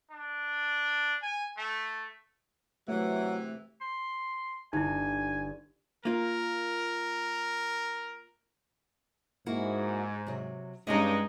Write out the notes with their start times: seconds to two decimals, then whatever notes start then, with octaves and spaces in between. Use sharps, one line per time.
0.11 D4
1.23 G#5
1.57 A3
2.88 C3 E3 F#3 A3 F#5
3.81 C6
4.73 G1 D#4 E4 G#5
6.05 A#3 F4 A#4
9.46 G#2 A#3 E4 F#4
10.26 C3 F#3
10.87 G2 G#3 C#4 D#4 G4 D#5